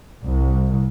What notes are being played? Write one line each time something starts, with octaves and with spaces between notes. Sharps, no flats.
C2